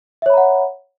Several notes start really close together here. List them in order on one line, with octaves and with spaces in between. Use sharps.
E5 C#5 B5 A#5 F#5